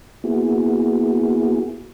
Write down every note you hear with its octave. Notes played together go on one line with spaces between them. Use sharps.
A#3 B3 E4 F#4 G#4